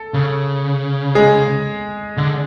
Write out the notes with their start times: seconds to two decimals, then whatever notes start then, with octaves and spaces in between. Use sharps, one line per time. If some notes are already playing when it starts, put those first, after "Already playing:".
Already playing: A4
0.14 C#3
1.15 G#3 G#4
2.17 D3